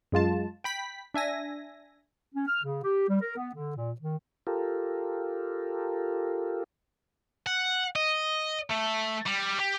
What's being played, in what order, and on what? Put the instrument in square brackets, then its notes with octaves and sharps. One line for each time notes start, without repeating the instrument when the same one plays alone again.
[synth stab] F#2 G#3 F4 A5
G5 B5 B6
D4 E5 G#5 A#6
[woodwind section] C#4
F6
C#3
G4
G3
A#4
B3
D3
A#2
D#3
[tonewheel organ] F4 G4 A4 A#4
[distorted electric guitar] F#5
D#5
A3
G3
G4